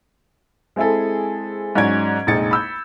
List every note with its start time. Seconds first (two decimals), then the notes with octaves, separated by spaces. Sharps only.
0.76 G#3 C4 E4 G#4 A4
1.75 G#2 F#3 C#4 D5 G#6 D7
2.27 F1 A#1 G#3 D#4 A6 C#7
2.51 B5 E6 G6